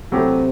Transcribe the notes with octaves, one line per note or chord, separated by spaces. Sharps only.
C3 F#3 A3 E4 G4